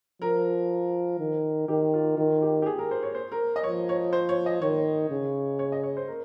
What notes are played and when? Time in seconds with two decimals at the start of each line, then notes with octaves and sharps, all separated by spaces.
0.22 F3 A#4
1.20 D#3
1.68 D#3 G4
1.94 F4
2.17 D#3 F4
2.42 G4
2.62 G4
2.66 G#4
2.79 A#4
2.91 C5
3.03 C#5
3.15 C5
3.32 A#4
3.56 D#5
3.64 F3 C#5
3.89 C#5
4.13 C5
4.29 C#5
4.46 D#5
4.62 D#3 C#5
5.10 C#3
5.59 C#5
5.72 D#5
5.83 C#5
5.97 C5
6.08 A#4